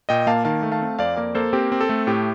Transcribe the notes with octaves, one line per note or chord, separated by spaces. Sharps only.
A#2 D#5 G5
A#3 F5 A5
D#3 F5 A5
A3
F5 A5
C4
F2 D5 F5
A#3 A#4 D5
A#3 A4 C5
C4 G4 A#4
C4
A4
A3
A2 G4